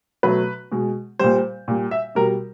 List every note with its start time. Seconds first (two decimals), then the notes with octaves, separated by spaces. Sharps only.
0.23 B2 F#3 A3 B4
0.72 B2 G#3
1.19 A#2 G3 C5
1.68 A#2 G3
1.91 E5
2.15 B2 G3 A#4